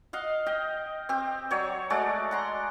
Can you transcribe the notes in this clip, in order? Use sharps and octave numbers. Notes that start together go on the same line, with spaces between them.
D#5 F5 F#5
D#5 G5
C4 G4
F#3 C#5 D5
G#3 A3 F#4 D5
F#5 A#5 C6